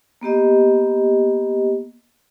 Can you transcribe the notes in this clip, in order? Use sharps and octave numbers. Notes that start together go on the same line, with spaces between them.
A#3 B3 G4 D#5